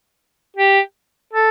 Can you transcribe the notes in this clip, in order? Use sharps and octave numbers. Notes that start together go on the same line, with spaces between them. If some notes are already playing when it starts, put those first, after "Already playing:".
G4
A4